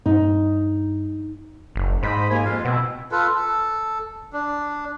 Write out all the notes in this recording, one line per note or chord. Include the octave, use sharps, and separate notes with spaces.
G2 D#4
F#1
G#2 C5 D#5 B5
D#2 A#3 G#5
F2 G#3 F4
B2 B3 C4 E4
F4 A4 B4
A4
D4